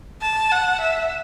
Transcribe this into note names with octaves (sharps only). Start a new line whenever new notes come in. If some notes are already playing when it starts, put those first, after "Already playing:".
A5
F#5
E5